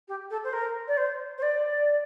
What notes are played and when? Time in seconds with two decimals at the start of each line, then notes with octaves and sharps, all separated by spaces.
0.08 G4
0.30 A4
0.44 C5
0.53 A#4
0.88 D5
0.97 C5
1.38 C5
1.42 D5